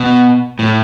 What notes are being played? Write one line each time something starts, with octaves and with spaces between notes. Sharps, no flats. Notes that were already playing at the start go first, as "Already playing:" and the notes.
Already playing: B2
A2